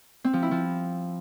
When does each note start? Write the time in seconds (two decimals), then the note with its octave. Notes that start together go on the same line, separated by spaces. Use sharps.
0.24 C4
0.33 F3
0.42 E4
0.51 F3